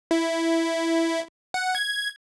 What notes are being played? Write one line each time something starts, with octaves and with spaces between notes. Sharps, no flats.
E4
F#5
G#6